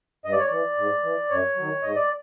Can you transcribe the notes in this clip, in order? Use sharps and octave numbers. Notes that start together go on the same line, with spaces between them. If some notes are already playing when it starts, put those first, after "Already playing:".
G2 D#5
D5
C#5
E3 D5
G#2
E3
F#2 C#5
D#3 F#3
G#2 D#5
D5